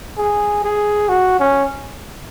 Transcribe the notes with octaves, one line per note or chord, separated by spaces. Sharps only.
G#4
G#4
F#4
C#4